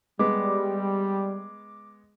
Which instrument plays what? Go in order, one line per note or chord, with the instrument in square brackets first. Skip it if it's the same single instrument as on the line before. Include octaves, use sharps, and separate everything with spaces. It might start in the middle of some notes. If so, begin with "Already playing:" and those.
[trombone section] G3 [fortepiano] G#3 B3 [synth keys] D6